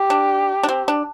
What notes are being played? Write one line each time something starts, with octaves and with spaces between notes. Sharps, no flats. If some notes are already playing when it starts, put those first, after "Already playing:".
Already playing: G4
D4
D4
C4
D4